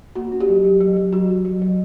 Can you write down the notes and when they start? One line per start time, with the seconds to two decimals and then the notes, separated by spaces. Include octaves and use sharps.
0.15 A#3 F#4
0.32 C#4
0.40 G4
0.49 F#3
0.64 F#3
0.81 F#3
0.97 F#3
1.13 F#3 F#4
1.29 F#3
1.45 F#3
1.62 F#3